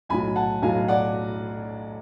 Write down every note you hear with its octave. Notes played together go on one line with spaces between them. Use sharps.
B1 A2 F#3 G#5 B5
F#5 A5
B1 A2 F#3 F5 G#5
D5 F#5